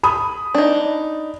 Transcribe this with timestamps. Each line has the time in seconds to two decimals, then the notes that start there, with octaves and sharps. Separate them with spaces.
0.03 B5 D#6
0.54 D4 D#4